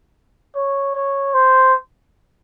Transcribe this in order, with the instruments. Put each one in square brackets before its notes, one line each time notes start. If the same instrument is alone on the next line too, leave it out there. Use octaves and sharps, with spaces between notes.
[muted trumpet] C#5
C#5
C5